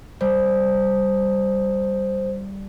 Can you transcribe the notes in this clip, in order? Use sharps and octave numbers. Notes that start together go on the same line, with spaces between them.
G3 C5